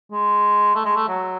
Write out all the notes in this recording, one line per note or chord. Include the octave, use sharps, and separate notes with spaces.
G#3
A3
G#3
A3
F#3